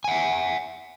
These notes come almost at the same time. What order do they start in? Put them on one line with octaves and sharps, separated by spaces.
G#5 F#5 E5